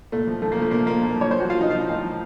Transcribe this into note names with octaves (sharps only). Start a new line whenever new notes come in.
A#2 A3
F3
F3 A3
A#3
F3 A3
A#2 A#3
F3 A#3
A#2
F3
C#5
F3 C5
F#4
F3 F4
F3 D#4
F4
F3 D#4
A2
F3